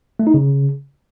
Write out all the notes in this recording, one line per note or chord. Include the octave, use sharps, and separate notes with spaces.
A3
D#4
C#3